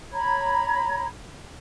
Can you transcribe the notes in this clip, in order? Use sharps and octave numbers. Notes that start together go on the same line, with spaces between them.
C#5 A#5 B5 G#6